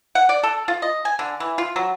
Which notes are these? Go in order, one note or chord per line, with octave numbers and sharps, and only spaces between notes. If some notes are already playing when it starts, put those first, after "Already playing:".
F#5
D5
A4
F4
D#5
G#5
D3
E3
F4
F#3